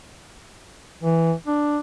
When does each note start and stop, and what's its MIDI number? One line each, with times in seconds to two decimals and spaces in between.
1.03 1.33 52
1.47 1.80 62